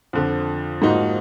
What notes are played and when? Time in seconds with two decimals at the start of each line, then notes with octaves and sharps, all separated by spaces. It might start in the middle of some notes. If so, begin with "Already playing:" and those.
0.13 F2 D3 F3
0.82 G#2 F3 A#3 D#4 F#4